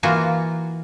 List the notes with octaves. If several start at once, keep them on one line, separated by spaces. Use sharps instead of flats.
E3 A#3 F4 F#4